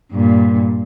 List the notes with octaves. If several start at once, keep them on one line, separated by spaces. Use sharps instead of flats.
G2 A#2